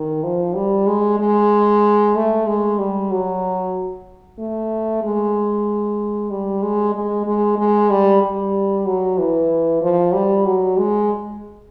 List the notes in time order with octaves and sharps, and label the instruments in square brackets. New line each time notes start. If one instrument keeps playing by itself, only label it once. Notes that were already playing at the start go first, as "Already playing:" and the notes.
Already playing: [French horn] D#3
F3
G3
G#3
G#3
A3
G#3
G3
F#3
A3
G#3
G3
G#3
G#3
G#3
G#3
G3
G3
F#3
E3
F3
G3
F#3
G#3